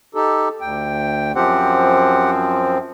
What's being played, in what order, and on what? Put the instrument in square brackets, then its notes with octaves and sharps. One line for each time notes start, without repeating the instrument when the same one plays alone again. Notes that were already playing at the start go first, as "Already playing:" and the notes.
[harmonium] D#4 G4 A4
D2 G5
[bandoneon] F#2 F3 C4 [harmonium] G4 F#5